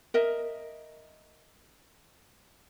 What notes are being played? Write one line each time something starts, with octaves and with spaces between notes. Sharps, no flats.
A#4 D#5 E5